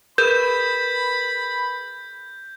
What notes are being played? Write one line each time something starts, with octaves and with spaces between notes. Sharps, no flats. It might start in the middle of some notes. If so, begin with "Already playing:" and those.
G#4 A#4 B4 B5 G6